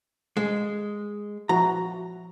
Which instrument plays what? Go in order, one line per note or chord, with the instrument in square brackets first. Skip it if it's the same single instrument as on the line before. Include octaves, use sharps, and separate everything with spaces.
[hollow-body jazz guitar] G#3
[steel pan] F3 E4 F#4 [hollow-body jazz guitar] A#5